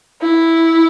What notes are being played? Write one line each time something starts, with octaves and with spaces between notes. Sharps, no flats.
E4